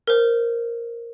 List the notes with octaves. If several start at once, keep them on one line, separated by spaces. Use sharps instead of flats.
A#4 C5